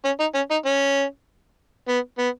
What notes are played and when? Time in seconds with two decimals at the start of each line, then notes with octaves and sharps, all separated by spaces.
0.05 C#4
0.20 D#4
0.35 C#4
0.51 D#4
0.66 C#4
1.88 B3
2.18 B3